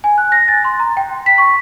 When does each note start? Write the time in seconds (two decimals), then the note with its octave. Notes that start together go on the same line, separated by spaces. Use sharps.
0.04 G#5
0.18 F#6
0.32 A#6
0.48 A6
0.65 C6
0.80 A#5
0.97 G5
1.26 B6
1.38 C#6